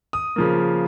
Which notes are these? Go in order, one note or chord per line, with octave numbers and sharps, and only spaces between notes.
D#6
C#3 F3 A#3